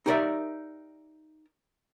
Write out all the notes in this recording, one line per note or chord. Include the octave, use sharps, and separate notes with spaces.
D#4 G4 A#4 B4 D5 E5